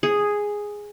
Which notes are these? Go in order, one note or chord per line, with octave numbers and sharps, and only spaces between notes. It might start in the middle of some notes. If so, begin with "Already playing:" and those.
G#4